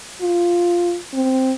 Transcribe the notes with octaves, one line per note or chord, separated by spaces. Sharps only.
F4
C4